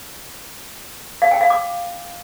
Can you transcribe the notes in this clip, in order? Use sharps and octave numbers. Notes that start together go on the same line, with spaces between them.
F5
G5
F5
D6